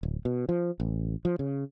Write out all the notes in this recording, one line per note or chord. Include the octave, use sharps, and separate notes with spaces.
D1
B2
F3
A1
F3
C#3